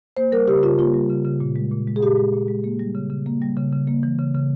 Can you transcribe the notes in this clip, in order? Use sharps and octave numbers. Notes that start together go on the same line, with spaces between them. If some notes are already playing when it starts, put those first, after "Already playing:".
A#3 C5
G3 A#4
C#3 G4
C#3 F4
A#3 F4
G3
C#3
C#3
A#2
G#3
A#2
G#3
G#4
A#2 G4
G#3
A#2
G#3
A#3
G3
C#3
C#3
A#3
G3
C#3
C#3
A#3
E3
C#3
C#3